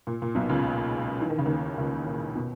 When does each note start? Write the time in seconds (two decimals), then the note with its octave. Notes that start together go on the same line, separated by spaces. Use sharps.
0.07 A#2
0.22 A#2
0.35 B1 B2
0.49 C#2 C#3
1.22 E3
1.30 D#3
1.39 C#3
1.46 D#2 D#3
1.78 C#2 C#3
2.07 A#2
2.35 B2